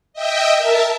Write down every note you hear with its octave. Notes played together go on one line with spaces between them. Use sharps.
D#5 E5 G5
A#4 E5 A5